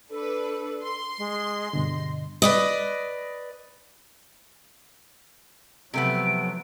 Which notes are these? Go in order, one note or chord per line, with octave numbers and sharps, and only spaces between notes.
D4 A4 B4
C6
G#3
G2 B2 D3 D#5
B4 D5 D#5
C3 F3 F#3 A3 B3 D7